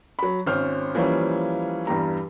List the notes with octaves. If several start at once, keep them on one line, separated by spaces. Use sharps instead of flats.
F#3 B5
G#1 C#4 C5 F6
E3 F3 G3 A#3 C#4
E2 G2 G3 A#5